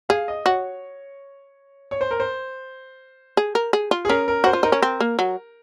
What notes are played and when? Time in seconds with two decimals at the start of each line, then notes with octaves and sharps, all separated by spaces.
0.09 G#4 F5
0.28 D#5
0.46 F#4 C#5
1.91 C#5
2.01 C5
2.11 A#4
2.20 C5
3.37 G#4
3.55 A#4
3.73 G#4
3.91 F4
4.05 G#4
4.09 C#4 A#4
4.28 A#4
4.44 F#4 C5
4.53 F4
4.63 D#4 A#4
4.72 C#4
4.82 C4
5.00 A#3
5.19 F#3